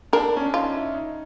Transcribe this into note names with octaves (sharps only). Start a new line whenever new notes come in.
D4 A#4
C#4
D4
D#4 F4
E4
D#4